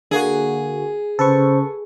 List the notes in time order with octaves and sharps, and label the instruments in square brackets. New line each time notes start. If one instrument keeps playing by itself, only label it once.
[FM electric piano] D3 A#3 F#4 [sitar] G#4
[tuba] C#3 [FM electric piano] A4 B4 C#6 [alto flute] C5